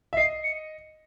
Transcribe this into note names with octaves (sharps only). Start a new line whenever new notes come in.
E5
D#5 C7
C#7